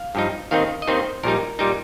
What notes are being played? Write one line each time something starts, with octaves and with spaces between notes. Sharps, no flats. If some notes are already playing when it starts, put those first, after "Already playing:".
Already playing: F5
G2 F3 D#4
D#2 D#3 C4 D#4 F5
D#5
D#2 D#3 C4 D#4 C5
A#1 A#2 G3 D#4 A#4
A#2 G3 D#4